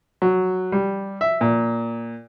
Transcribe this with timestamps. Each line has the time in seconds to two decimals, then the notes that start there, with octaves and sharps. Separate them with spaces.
0.22 F#3
0.72 G3
1.21 E5
1.41 A#2